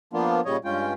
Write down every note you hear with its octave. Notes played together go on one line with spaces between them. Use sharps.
F3 A#3 B3 D4 F4
A#2 C#3 G3 C#5 D#5
G2 G#3 C#4 F4 G5